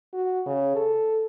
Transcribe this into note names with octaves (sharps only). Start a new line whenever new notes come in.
F#4
C#3
A4